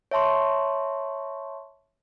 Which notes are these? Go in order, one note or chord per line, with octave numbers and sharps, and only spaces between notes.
C#5 E5 A5 C6 C#6